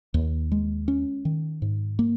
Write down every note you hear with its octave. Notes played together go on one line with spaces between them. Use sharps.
D#2
G#3
C#4
D#3
G#2
A#3